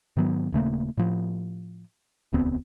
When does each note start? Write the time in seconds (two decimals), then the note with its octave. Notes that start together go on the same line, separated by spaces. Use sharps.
0.17 G#2 D#3 F#3 B3
0.52 D#1 C#3 A3 A#3
0.97 A2 F3
2.33 E1 D2 B3 C4